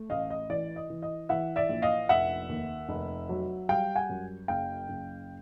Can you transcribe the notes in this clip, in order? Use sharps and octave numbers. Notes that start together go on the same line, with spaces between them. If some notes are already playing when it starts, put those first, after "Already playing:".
Already playing: A3
A1 D#5 F5
D#5
E3 D5
D#5
E3
D#5
E3 E5 F#5
D5 E5
A#1
D#5 F5
F1 E5 F#5
D#2
F1
F#3
G3 F5 G5
F#5 G#5
F#2
F#1 F5 G5
F#1